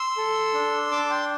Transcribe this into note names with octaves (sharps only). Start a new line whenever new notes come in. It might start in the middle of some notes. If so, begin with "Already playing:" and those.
Already playing: C6 E6
A4
D4
D4 A5 D6
G5 C6